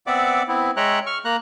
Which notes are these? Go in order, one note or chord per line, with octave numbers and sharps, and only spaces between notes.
B3 C4 D5 E5 F#5 D6
B3 C4 E4
G#3 C#5 E5 G5 A#5 F#6
C#6 F6
A#3 A#5 F#6